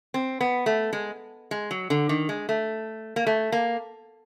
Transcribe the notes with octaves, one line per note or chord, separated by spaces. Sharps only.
C4
B3
A3
G#3
G#3
F#3
D3
D#3
G#3
A3
A#3
A3
A#3